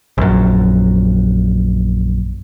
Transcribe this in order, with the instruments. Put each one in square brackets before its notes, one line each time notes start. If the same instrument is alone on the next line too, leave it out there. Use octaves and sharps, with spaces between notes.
[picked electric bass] A#1 F#2